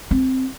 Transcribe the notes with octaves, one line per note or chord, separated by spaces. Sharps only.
C4